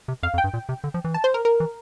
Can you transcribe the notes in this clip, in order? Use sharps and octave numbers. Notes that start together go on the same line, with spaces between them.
C3
F2 F5
F2
G5
G2
A#2
C3
D3
F3
E3
A5
C5
A#4
A#4
E3